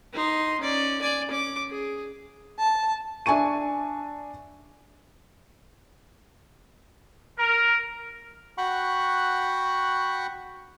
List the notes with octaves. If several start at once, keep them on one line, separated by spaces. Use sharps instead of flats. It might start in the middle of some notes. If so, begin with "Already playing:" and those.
D#4 C6
C#4 D5
D5 G#5
C#4 D6
G#4
A5
D4 E5 G#5 A5 C#6 D#7
A#4
F#4 F#5 G5 B5 C#6 F#6